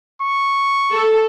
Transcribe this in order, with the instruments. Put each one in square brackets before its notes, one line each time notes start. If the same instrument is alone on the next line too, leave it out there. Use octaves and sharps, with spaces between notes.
[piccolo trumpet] C#6
[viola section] A4